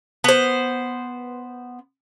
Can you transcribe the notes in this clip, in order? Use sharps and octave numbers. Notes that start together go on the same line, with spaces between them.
B3 C5